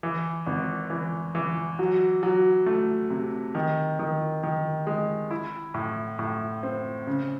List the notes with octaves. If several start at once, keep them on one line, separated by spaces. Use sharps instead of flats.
E3
G#1
E3
E3
F#3
F#3
A3
C3
D#3
D#3
D#3
G#3
E4
A2
A2
C4
C#3